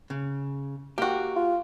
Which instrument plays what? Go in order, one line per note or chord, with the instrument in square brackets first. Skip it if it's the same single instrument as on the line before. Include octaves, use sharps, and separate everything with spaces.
[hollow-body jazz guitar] C#3
[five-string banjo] A#3 F#4 [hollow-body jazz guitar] G4
[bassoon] F4